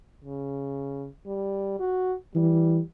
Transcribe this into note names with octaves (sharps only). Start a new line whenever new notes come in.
C#3
G3
F#4
E3 G3